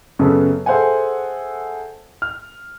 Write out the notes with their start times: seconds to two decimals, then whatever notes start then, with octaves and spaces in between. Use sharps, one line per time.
0.19 F#2 C#3 B3 A4
0.66 G#4 A4 C5 E5 F#5 G#5
2.22 F6